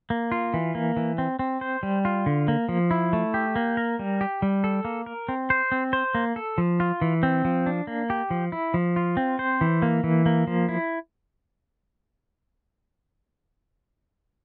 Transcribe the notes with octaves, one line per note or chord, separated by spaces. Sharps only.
A#3
F4
E3
A#3
E3
C4
C4
C5
G3
F4
D3
A#3
F3
E4
A3
G4
A#3
A#4
G3
G4
G3
A4
A#3
A#4
C4
C5
C4
C5
A#3
A4
F3
F4
E3
C4
F3
D4
A#3
G4
F3
E4
F3
F4
C4
C5
E3
A#3
E3
A#3
F3
E4